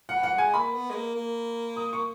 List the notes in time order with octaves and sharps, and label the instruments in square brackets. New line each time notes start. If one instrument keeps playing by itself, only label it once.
[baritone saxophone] E3 [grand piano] F#5
[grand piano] F#5
[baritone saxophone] G#3 [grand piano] G#5
[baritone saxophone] A#3 [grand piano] B5
[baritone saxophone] B3
G#3
A#3
A#3
[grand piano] D#6
C#6